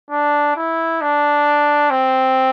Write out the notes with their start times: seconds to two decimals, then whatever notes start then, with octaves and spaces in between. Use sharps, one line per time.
0.10 D4
0.56 E4
1.01 D4
1.90 C4